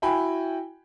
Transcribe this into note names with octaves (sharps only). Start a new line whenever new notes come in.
E4 F#4 G5 G#5 B5